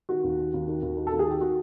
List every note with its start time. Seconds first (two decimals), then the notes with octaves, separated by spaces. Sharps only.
0.09 D#3 F#4
0.24 D#2
0.39 D#3
0.54 D#2
0.68 D#3
0.82 D#2
0.97 D#3
1.07 A4
1.12 D#2
1.19 G#4
1.26 D#3 G4
1.41 F#4